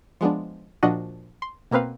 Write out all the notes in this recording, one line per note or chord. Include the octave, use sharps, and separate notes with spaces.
F3 G#3 B3 D4
A#2 F3 D4 F#4 D#5 F#5
C6
B2 A#3 C4 B4 F5